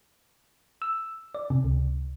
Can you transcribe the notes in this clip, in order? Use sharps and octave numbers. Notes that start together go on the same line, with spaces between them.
E6
D5
C3
C#2